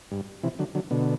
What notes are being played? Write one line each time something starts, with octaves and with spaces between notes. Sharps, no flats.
G2
C3 E3
D3 F#3
D3 F#3
B2 D3